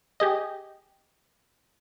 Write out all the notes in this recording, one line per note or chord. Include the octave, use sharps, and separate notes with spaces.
G4 G#4 D#5